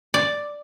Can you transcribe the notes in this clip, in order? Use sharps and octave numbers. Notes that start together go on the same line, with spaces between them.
D5